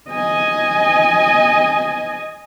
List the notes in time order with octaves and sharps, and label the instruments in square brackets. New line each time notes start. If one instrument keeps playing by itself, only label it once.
[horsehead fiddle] D#5 G#5